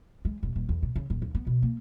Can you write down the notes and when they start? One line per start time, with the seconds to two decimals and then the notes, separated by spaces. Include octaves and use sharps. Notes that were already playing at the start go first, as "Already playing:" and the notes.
0.25 G#3
0.43 E1
0.56 D#1
0.69 E2
0.83 B2
0.96 C#3
1.10 D#1
1.22 D#2
1.35 B3
1.47 B2
1.62 A#3